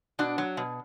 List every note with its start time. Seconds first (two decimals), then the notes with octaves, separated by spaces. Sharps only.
0.19 B2 D4 F#4
0.38 F#3
0.57 B2